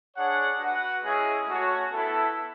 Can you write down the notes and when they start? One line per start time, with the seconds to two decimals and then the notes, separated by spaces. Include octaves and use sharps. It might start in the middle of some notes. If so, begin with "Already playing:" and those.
0.15 D4 G#4 C#5 F#5
0.59 F#4 B4 F#5
1.03 G#3 C#4 E4 G#4
1.47 A3 C#4 F#4 C#5
1.90 B3 E4 A4 E5